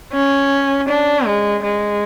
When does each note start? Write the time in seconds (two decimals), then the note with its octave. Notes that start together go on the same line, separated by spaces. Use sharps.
0.13 C#4
0.89 D4
1.26 G#3
1.64 G#3